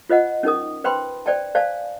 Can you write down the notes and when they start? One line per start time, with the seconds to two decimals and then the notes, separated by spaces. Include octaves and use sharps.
0.09 F4 C5 D#5 F#5
0.43 C#4 D#4 A#4 D#6
0.84 B4 C5 G5 B5 C6
1.26 C5 D5 G5 A5
1.55 C5 D5 F5 G#5 A5